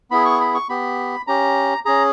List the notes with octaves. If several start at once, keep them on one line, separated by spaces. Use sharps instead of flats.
B3 E4 G#4 B5
C#6
B5
C#6
B3 G4 B5
C#4 G4 A#5
C#4 G#4 A#5